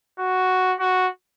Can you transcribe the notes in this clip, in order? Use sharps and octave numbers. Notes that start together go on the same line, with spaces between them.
F#4
F#4